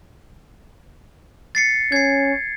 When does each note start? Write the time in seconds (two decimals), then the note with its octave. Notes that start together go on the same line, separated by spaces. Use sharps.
1.55 A6 C7 C#7
1.92 C#4 G#6 C7